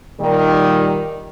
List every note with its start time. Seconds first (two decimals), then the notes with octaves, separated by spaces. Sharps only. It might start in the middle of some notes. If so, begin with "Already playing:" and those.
0.20 A#2 D#3 G3